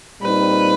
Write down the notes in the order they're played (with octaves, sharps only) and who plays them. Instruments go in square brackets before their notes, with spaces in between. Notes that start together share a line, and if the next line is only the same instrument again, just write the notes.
[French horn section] A#2 G3 C4 D#4 [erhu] B4